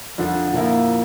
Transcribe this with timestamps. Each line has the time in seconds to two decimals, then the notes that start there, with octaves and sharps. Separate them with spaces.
0.18 F2 D3 F3
0.53 A#2 F3 A#3 E4